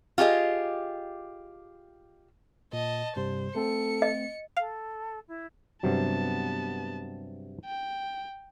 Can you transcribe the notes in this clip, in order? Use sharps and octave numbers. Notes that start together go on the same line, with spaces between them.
F4 G4 G#4 D#5
A#2 D#5 A5
G2 C3 G3 C5
A3 C4 A4 C#7
D#5
A4 F5
E4
G2 C3 F#3 B3 A5
G5